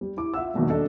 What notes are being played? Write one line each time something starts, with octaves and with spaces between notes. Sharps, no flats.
G3
E4 D6
F4 E5 F#5 E6
E1 A#1 B2 D#3
D#1 D4 A4 D#5